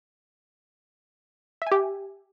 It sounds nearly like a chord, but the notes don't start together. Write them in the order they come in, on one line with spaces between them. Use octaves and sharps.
E5 G#5 G4